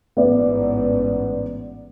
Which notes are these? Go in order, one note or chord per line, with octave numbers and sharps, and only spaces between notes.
A1 G#2 B3 D5